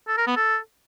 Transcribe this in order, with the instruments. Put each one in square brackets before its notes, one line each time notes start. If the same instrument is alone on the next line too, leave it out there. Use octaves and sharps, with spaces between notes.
[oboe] A4
A#4
B3
A4